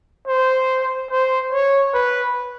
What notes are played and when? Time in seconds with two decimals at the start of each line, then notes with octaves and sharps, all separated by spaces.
0.28 C5
1.11 C5
1.53 C#5
1.94 B4